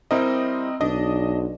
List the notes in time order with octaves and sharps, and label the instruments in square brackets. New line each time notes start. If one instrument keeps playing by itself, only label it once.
[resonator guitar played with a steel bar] G3 E4 [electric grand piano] C4 A#4 D#5
[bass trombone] B1 [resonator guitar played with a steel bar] D4 [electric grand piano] D#5